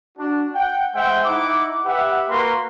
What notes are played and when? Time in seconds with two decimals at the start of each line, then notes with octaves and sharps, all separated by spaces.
0.18 D4 F#4
0.55 F#5 G5
0.95 G#3 C5 E5 F#5 G5
1.25 D#4 E4 F#5 D6
1.86 G4 B4 E5 F#5
2.30 A#3 F#4 A#4 B4 C6